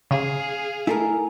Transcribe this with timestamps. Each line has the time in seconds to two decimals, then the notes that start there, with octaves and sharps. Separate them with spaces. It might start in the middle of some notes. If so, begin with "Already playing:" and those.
0.11 C#3 G#4 F5
0.87 A3 E4 A4 A#4 G#5